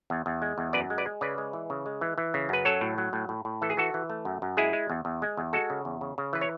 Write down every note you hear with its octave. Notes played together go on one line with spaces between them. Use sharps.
E2
E2
G#3
E2
F#2 B4 D5
G#3
B4 D5
G#3
C#3 B4 D5
G#3
E3
C#3
G#3
E3
E3
C#3
F#2 B4
F#3 A4 C#5
A2
F#3
A2
A2
A2
E3 A4
G#4
E3 F#4 A4
E3
A3
F#2
F#2
G#3 E4 G#4
G#3
E2
E2
G#3
E2
G#3 F#4 A4
C#3
E2
C#3
C#3
E3 B4
C#5